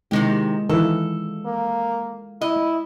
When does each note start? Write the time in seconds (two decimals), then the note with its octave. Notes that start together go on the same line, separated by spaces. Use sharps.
0.11 C3 D#3 G#3 A#3 E4 G4
0.69 D#3 E3 F4 A4
1.46 A#3
2.41 E4 D#5